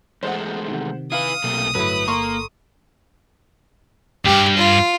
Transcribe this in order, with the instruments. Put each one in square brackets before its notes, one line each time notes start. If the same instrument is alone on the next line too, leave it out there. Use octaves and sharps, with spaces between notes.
[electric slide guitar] E2 G#3 A3 [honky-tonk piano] C5 F#5
[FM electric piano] C3 D#3
[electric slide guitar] E4 B4 [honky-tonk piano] F5 [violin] D#6
[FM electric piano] B1 [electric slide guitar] C3 A3 A#3
[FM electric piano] G1 A4 [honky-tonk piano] A2 F#3 [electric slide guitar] B4
[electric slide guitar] A#3 [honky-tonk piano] A#5 C6 C#6
[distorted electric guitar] C#2 G2 [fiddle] G4
[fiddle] F4